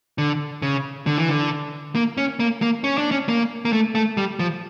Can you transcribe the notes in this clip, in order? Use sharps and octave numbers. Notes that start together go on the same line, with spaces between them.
D3
C#3
D3
E3
D3
A#3
C#4
A#3
A#3
C#4
D4
C#4
A#3
A#3
A3
A3
G3
F3